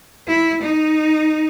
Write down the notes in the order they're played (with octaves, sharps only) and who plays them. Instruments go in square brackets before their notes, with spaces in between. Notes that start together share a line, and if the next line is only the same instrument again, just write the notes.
[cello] E4
D#4